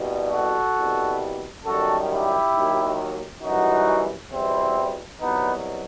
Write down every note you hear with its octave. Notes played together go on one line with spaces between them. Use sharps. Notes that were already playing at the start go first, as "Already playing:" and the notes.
Already playing: C2 B2 G3
F#4 A4
C2 B2 G3
F#2 D#3 G3 F#4 A4
E4 G4
D#2 D#3 F#3
F#2 E3 G3 D#4 F#4
E2 B2 G3 C4 E4
C2 B2 F#3 B3 D#4